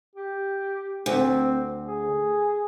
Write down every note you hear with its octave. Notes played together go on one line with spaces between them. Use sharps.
G4
D2 C4
G#4